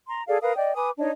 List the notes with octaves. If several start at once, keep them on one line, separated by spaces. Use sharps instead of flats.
A#5 C6
G#4 A4 D5 F5
A#4 B4 F5 D#6
D5 D#5 G5
B4 G#5 D6 D#6
D4 D#4 C#5 D#5